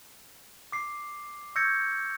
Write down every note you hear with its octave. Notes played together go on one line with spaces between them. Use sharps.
D6 C7
C#6 E6 G6 G#6 A#6 C#7